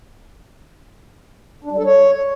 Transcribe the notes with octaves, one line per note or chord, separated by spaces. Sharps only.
D4
G3
A4
C#5